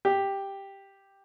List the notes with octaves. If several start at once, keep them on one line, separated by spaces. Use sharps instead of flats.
G4